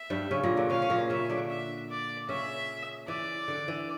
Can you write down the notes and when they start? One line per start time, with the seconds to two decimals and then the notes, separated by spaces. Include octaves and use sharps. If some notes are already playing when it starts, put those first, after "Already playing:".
Already playing: E5
0.10 G2 G3
0.31 C#3 C#4
0.43 A#2 A#3
0.57 D3 D4
0.70 C#3 C#4 F5
0.82 C#4
0.90 A#2 A#3
1.10 C#3 C#4 E5
1.29 D3 D4
1.50 E5
1.90 D5
2.29 C#3 C#4 E5
3.08 E3 D5
3.48 D3
3.68 E3